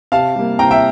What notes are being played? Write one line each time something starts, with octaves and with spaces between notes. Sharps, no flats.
C3 F5 A5
G3 A#3
C3 G5 A#5
E5 G5